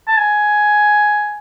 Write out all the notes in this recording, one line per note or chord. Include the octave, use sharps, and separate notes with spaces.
A5
G#5